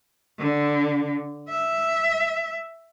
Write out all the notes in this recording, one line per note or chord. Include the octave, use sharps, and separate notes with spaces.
D3
E5